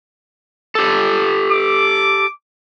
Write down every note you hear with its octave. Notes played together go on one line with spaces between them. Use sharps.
G4 A4
D6